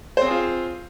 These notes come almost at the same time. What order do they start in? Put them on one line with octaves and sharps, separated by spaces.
C5 C4 G#4 F4